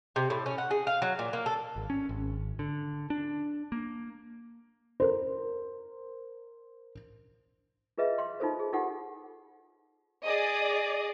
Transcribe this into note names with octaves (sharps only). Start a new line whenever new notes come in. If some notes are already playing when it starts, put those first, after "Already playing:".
C3
A2
C#4
F#5
G#4
F5
F#3
A#2
A#3
A4
G#1
C#4
G#1
D3
D4
A#3
A#4 C5
F4 G#4 B4 D#5 E5
F5 C6
D#4 F4 A4 C5
G#4
D#4 F4 G4 A4 F#5 G#5
G#4 D5 D#5 D#6